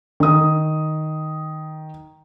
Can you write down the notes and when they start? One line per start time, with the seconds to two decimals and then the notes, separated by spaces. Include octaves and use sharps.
0.20 D#3 D#6